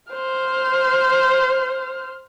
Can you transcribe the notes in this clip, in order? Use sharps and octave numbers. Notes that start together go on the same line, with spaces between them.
C5 F6